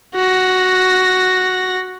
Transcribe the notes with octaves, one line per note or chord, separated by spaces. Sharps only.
F#4 A#6